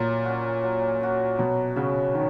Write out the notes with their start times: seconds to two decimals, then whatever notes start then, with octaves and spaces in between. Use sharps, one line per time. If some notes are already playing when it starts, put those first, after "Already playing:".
Already playing: A#2 F#3
0.25 C#4 F#4
0.63 F#3
1.01 C#4 F#4
1.39 B2 F#3
1.76 C#3 C#4 F#4
2.15 D#3 F#3